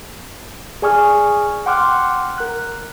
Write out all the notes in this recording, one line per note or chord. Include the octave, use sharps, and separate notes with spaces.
G#4 D5 G#5 C#6 D#6 F6
F#5 G5 C6 D6 F6 F#6
A#4 F#6